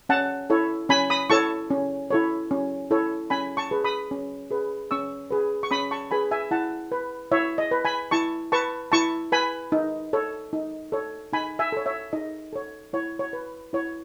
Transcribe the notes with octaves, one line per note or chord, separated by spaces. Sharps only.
C#4 F#5 A5
E4 A4 C#5
C#4 G#5 B5
B5 D#6
E4 A4 C#5 A5 C#6
C#4
E4 A4 C#5
C#4
E4 A4 C#5
C#4 G#5 B5
A5 C#6
G#4 B4
B5 D#6
C#4
G#4 B4
C#4 C#6 E6
G#4 B4
C#6
C#4 B5 D#6
A5 C#6
G#4 B4 G#5 B5
E5 G#5
E4 F#5 A5
B4
E4 C#5 E5
D#5
B4
G#5 B5
E4 A5 C#6
B4 A5 C#6
E4 A5 C#6
B4 G#5 B5
D#4
A4 C#5
D#4
A4 C#5
D#4 G#5 B5
E5 G#5
A4 C#5
C#5 E5
D#4 D#5
A4 C#5
E4 C#5
C#5
B4
E4 C#5